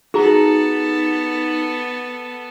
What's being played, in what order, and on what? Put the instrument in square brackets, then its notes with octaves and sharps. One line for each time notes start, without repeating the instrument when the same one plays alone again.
[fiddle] B3 A4 [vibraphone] D#4 [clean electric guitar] F#4 A5 A#5 [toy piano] G#4